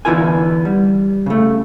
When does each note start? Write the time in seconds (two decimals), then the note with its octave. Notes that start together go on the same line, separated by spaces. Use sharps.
0.05 D3 E3 B3 E4 A#4 G#5
0.65 G3
1.26 C#3 A3